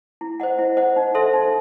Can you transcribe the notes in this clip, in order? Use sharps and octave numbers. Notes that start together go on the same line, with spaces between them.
E4
C5 D#5 F#5
E4
C5 D#5 F#5
D#4
A4 C5 E5 C6
D#4